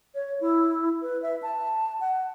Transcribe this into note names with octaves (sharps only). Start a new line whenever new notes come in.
C#5
E4
B4
E5
A5
F#5